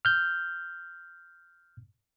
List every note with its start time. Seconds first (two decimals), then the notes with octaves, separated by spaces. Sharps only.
0.05 F6 G6